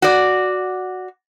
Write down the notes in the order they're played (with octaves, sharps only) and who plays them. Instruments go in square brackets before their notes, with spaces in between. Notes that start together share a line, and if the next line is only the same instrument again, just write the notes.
[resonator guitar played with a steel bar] F#4 D5